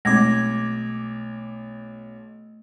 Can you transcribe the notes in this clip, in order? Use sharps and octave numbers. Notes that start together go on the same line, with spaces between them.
B1 G#3 A3 C4 D6 G#6 A#6